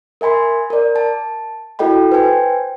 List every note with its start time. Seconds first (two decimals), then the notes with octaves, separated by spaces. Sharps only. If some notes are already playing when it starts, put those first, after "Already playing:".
0.21 A#4 E5 G#5 B5 C6
0.70 A#4 D5
0.96 A5
1.79 E4 F#4 A4 D#5 G5 B5
2.12 B4 C5 G5 G#5